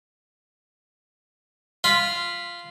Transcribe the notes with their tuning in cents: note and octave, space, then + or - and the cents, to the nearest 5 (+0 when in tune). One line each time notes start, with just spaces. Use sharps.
F4 -10 B5 +0